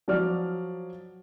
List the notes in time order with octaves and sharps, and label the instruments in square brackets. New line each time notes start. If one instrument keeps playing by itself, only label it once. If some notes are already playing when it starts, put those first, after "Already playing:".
[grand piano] F3 F#3 F#4 D5 F6